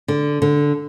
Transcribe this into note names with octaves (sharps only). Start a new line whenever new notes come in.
D3
D3